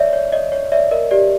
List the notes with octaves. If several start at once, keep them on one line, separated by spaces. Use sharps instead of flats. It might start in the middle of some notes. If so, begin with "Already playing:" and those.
Already playing: C#5 D5 E5
C#5
C#5 D#5
C#5
C#5 D5 E5
A#4 D#5
G4 D5